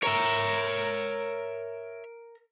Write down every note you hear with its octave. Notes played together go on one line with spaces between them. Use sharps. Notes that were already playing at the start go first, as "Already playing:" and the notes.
A#4 C#5 E5 A#5